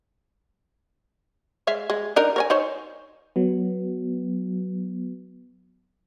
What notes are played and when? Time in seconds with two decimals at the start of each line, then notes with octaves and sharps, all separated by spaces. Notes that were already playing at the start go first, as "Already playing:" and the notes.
1.67 G#3 E5 F5
1.90 G#3
2.16 D4 D#4 A#4
2.36 A#4 C#5 G#5
2.50 D#4 C5 C#5
3.36 F#3 B3